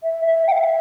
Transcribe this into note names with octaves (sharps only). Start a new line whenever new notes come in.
E5
E5
G5
E5